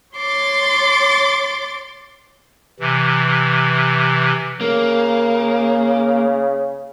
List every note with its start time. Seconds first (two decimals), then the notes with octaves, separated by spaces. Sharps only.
0.15 C#5 C6 D6 A6
2.80 C3 E3
4.61 C#3 A#3